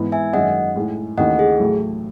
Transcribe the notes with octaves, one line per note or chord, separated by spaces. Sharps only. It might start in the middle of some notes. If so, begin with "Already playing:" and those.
Already playing: G#2 E3 B3
E5 G#5
F#2 D#3 G#3 C#4 D#5 F#5
A2 G#3 D#4 G#4
D#2 C#3 E3 A3 D#4 D#5 F#5
G#4
A1 A2 F#3 A3 E4